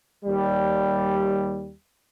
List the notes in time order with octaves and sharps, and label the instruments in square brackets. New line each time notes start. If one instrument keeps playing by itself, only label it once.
[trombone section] D#2 G3